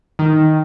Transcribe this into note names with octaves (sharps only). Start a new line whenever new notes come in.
D#3